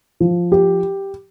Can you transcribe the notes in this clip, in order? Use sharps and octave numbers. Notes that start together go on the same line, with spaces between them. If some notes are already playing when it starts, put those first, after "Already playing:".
F3
G4